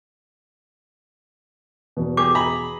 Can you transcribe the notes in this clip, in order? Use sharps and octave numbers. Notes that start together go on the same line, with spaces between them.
E2 B2
G4 G#4 D6
G#4 A#5 B5